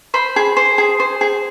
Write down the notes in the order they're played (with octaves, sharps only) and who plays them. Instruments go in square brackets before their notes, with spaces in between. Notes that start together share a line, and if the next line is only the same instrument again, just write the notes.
[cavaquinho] C5 B5
G#4
C5
G#4
C5
G#4